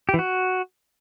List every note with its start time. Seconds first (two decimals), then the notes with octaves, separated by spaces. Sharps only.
0.09 G4
0.14 E3
0.19 F#4